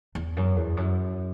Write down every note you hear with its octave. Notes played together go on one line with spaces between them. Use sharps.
E2
F#2
E2
F#2